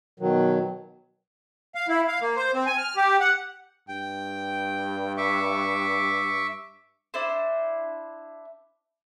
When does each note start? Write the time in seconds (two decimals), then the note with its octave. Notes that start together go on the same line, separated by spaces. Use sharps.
0.20 B2 D#3 F#3
1.75 F5
1.89 E4
2.08 F5
2.21 A#3
2.36 C5
2.54 C4
2.66 G#5
2.78 F6
2.96 G4
3.21 F#5
3.88 G2 G5
5.17 E5 C#6 D6
7.14 D4 E4 C5